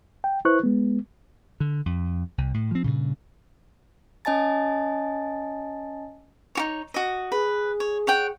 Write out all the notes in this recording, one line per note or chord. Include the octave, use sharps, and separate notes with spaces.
G5
E4 B4 C5 C#6 F#6
G#3 B3
D3
F2
C2
A2
F3 C4
G2 A#2 C#3
C#4 D#5 G#5 A5 A6
D#4 F#4 C#5
F#4 D#5
G#4 B4
C#5
C#5 F#5 G5